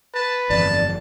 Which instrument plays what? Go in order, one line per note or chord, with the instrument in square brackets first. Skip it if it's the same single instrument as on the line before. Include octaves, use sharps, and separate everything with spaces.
[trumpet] B4 [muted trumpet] A5
[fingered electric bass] G1 F2 E3 [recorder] D5 [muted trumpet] A5